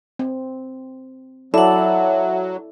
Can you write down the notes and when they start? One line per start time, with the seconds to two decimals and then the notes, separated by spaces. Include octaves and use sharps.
0.19 C4
1.54 F#3 E4 A4 D5 E5 F#5